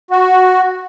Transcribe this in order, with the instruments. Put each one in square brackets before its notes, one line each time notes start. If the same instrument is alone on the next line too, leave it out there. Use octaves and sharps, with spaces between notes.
[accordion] F#4